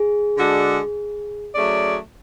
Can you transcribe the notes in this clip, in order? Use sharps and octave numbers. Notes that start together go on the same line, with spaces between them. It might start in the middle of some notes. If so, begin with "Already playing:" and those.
Already playing: G#4
D3 G#3 D4 F#4 A4
F#3 A3 C#4 G#4 D5